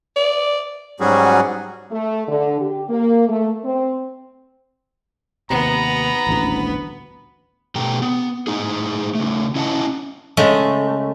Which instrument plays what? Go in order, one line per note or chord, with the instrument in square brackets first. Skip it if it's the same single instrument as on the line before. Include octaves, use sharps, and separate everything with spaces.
[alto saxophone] D5
[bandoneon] G#2 F#3 G3 C#4 F#4 G#4
[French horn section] A3
D3
G4
A#3
A3
C4
[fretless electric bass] D#2 C3 [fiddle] B3 [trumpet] A#5
[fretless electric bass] D#1 A1 D2
[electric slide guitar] B2 A3 G4 G5 A#5
B3
A2 D#4 G#4
C#3 A3
C#4 E4 D#5 F#5 G5 A5
[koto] C#3 G#3 A3